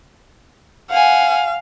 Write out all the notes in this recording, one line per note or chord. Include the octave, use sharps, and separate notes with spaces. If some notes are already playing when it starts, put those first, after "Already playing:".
F5 F#5 G#5